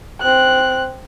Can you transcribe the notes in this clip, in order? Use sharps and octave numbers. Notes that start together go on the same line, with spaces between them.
C4 F#6